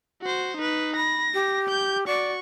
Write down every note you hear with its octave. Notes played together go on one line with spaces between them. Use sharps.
F#4 C5
D#4 B4
B5 A#6
G4
G6
F#4 D5 C#6